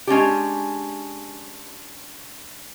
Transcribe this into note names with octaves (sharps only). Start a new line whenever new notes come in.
G#3 C#4 D4 G4